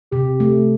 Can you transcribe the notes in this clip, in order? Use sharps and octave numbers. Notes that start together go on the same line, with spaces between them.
C3 G4
A3